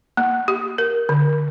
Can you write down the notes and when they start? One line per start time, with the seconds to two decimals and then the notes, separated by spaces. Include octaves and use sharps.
0.17 A#3
0.48 G4
0.78 A#4
1.09 D3